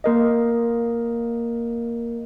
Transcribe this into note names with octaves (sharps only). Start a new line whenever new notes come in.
A#3 A#4 D#5